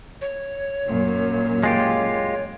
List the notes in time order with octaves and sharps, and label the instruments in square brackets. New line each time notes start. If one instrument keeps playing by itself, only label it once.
[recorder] C#5
[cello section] F#2 A#2
[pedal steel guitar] G#3 F4 G4